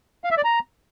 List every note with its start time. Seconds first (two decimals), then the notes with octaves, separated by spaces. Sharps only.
0.24 F5
0.31 E5
0.37 D5
0.44 A#5